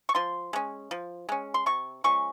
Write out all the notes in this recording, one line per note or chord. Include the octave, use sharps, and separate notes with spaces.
C#6
F3 C6
G#3 C#4
F3
G#3 C#4
C6
C3 C#6
F3 G#3 C#4 C#6